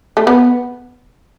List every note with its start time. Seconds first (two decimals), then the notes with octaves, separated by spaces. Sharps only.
0.17 A3
0.27 B3